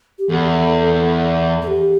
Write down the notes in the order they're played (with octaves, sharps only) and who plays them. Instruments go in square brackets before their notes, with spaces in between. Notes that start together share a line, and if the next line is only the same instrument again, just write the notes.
[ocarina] G4
[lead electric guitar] E2 [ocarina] A4
[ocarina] A4
G4